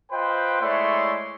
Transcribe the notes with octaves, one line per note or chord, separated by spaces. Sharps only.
F4 B4 C5 D#5 G5
G#3 A3 E4 C#5 D5 C6